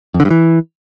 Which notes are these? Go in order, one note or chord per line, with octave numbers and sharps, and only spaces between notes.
F2
D3
G2
E3